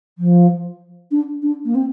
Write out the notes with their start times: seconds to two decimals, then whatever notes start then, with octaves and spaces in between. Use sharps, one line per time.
0.18 F3
1.11 D4
1.42 D4
1.65 A#3
1.75 C4